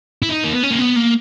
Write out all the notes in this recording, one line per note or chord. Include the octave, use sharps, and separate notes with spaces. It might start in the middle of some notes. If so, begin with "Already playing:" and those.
E4
D#4
A#3
B3
C#4
A#3
B3
A#3